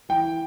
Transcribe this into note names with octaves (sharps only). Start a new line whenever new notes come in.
E3 G5